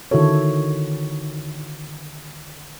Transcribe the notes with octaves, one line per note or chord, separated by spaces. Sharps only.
D3 D#3 E4 F#4 A4 C#5